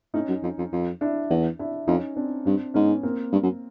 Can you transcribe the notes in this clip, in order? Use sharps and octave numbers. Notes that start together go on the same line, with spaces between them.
A2 C#4 D#4
F#2
F2
F2
F2
D4 E4
E2
D4 E4
F2 C#4 D#4
C4 D4
G2 C4 D4
G#2 B3 C#4
A#3 C4
G2
F#2